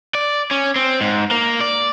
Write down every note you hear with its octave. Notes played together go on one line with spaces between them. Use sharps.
D5
C#4
C4
G#2
A#3
D5